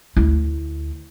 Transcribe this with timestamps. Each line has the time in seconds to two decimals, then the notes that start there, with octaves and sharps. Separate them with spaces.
0.16 D2 E4